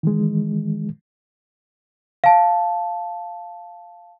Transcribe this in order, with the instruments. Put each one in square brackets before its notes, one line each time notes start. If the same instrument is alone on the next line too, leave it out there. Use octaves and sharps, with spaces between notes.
[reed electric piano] D#3 E3 G#3
[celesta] F5 A5